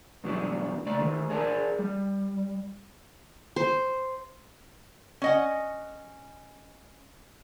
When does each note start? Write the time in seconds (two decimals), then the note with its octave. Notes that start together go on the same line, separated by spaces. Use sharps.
0.24 G2 B2 E3 F#3 B3 D4
0.86 C#3 A3 D5
0.99 D#3 A3
1.30 G#4 A#4 D5 A5
1.79 G3
3.56 C5
5.22 C#4 D#5 F#5